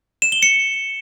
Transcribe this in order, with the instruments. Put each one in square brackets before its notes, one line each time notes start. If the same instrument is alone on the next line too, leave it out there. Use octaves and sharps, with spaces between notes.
[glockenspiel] E7
G7
C#7